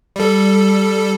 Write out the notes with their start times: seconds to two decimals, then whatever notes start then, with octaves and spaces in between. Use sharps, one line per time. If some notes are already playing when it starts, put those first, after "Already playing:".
0.16 G3 A4